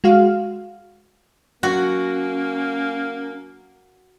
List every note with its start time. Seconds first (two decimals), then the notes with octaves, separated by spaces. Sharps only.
0.04 G#3 F#4 F5
1.63 F#3 A#3 C#4 F#4 F#5